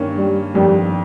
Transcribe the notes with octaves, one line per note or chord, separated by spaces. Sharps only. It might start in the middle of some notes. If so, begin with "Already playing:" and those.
Already playing: G2 D#3 A#3 C#4
G3
G1 F2 D#3 G3